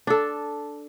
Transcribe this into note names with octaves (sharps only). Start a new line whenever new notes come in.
D4 A4